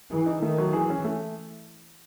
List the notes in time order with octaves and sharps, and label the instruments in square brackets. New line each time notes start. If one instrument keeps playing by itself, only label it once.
[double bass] E3 [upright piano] G#4
[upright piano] D#4
[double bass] D#3 [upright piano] A3
[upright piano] F#3
[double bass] E3 [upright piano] G#4
[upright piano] C#4
A3